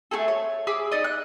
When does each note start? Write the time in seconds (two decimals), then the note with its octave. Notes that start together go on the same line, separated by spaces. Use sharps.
0.11 A3 F4 G#4 A4
0.28 C#5
0.67 G#4 B5 D6 E6
0.92 D#4 D5 D#5
1.04 F#6